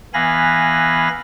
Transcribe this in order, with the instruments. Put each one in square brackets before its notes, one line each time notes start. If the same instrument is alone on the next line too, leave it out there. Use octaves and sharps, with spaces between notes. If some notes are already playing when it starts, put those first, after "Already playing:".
[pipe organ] E3 B3 F5 G#5 B5 A#6